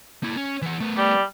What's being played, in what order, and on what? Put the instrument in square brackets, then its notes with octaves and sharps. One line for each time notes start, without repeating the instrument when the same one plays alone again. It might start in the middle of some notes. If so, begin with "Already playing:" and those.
[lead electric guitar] A#3 E4
C#4
E3 F#5
A3 B3
[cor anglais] G3